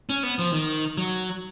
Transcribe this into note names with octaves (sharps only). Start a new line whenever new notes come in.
C#4
B3
F3
D#3
F#3